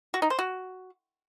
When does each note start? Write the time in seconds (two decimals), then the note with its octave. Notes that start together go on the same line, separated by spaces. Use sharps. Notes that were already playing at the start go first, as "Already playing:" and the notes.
0.14 F#4
0.22 D#4
0.30 C5
0.39 F#4